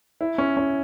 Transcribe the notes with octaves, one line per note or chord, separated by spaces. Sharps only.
E4
C#4
C#4